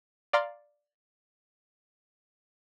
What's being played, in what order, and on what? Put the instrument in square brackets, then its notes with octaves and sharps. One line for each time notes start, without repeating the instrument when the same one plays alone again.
[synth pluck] D5 F5 A#5 C6 F6